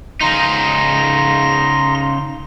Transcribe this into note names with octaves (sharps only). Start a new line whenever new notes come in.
C#3 D#4 A#5 C6 A#6